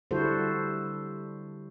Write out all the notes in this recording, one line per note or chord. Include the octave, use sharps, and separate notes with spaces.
D3 G3 E4 F#4 A4 C5